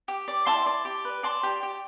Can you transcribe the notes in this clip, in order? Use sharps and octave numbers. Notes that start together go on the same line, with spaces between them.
G4
D5
E4 A5 C6
D5
G4
B4
D5 A5 C6
G4
G4